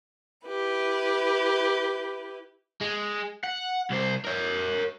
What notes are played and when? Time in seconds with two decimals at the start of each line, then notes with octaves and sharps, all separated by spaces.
0.46 E4 G4 B4
2.81 G#3
3.44 F#5
3.91 C2 C5
4.25 A#4 C#5